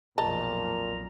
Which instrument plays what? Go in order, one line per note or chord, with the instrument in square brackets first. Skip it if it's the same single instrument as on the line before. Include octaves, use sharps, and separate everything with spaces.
[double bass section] B1 F2 A#3 [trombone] A#2 [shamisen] D#5 A5 [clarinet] A#5